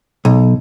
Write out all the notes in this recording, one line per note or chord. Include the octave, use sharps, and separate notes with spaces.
B1